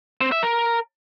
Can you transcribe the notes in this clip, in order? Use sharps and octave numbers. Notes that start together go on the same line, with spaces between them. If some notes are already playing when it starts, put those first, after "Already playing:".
C4
E5
A#4